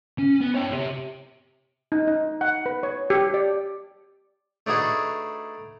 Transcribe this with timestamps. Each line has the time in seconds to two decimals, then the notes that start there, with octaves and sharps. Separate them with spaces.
0.18 C#4
0.41 B3
0.55 C#5 G5
0.70 C3 G4
1.92 D#4
2.07 D#4
2.41 F#5
2.66 B4
2.83 C#5
3.10 G4
3.34 D5
4.67 A3 D4 D#4 F#4 G#4 B4